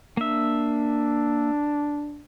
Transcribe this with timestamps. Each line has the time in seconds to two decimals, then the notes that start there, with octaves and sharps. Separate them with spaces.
0.17 A#3 D4 E5